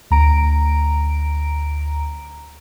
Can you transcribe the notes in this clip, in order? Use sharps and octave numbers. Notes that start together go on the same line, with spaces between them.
D2 A#5 D7